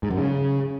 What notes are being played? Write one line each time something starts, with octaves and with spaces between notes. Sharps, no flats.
G#2
F#2
C#3